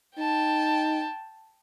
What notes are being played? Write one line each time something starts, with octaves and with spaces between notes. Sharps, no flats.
D#4 G5 A5